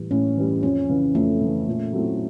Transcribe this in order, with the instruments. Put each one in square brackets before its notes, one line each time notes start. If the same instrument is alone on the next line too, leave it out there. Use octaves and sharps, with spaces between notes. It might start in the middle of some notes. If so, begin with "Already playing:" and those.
Already playing: [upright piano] A2 E3 G3
[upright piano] A2 [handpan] C#4
[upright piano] E3 G3
[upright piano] F2 [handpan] C#4
[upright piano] C#3 E3
[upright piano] F2 [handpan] A3
[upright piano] C#3 E3
A#2
F#3 A3 C4 E4